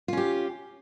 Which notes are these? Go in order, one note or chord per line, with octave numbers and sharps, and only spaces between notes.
C#4 F4 G4